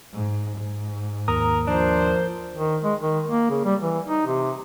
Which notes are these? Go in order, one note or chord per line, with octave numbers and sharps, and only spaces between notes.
G#2
G#2
D#2 A#4 A#5 D#6
F3 D4 A#4 C5
D#3
G#3
D#3
A#3
C#3
G3
E3
D#4
C3